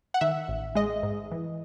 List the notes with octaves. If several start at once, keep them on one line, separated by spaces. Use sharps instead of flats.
F#5
D#3 E5
A1
G#3 D#5
G#2
E3